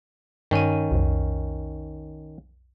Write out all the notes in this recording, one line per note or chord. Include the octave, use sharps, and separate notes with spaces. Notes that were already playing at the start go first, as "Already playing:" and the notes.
G2 D#3 C#4 D#7
B1 F2